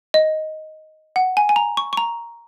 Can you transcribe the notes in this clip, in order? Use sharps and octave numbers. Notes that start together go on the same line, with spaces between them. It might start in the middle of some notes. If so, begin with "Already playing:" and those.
D#5
F#5
G#5
G#5
A#5
C#6
C#6
A#5